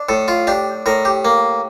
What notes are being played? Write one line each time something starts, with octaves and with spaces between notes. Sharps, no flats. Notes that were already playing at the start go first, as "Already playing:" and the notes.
Already playing: D4
A2 A4
F4
D4 G4
A2 A#4
G4
A#3